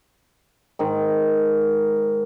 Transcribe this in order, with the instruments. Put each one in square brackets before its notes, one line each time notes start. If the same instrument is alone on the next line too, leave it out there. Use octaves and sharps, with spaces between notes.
[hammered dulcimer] G#2 D#3